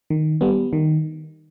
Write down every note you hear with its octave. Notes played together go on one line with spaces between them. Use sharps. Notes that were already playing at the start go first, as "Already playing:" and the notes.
D#3
G3 B3
D#3